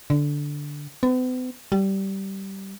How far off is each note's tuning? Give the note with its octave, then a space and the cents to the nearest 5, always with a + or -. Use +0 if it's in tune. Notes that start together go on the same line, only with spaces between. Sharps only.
D3 -5
B3 +45
G3 -15